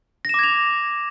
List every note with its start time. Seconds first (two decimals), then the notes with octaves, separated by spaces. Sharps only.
0.25 A#6
0.29 E7
0.34 D6
0.39 G#6
0.44 F7